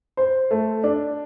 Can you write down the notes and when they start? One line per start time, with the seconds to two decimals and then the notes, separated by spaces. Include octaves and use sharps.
0.17 C5
0.51 A3
0.84 D4